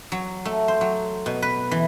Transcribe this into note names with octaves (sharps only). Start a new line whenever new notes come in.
F#3
A3
C5
F#3
B2
B4
E3